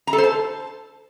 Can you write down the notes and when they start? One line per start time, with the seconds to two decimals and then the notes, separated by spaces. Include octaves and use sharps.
0.07 A#5
0.13 A4
0.18 C5
0.24 A5